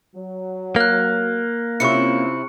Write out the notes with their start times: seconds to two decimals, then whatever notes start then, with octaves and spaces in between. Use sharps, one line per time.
0.16 F#3
0.76 A#3 F6 F#6
1.80 C3 C4 C#4 E4 F4 C#6 C#7